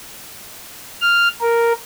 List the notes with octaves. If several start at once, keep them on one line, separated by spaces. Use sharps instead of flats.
F6
A#4